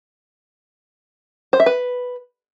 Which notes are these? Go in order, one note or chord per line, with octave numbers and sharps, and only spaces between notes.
C5
E5
B4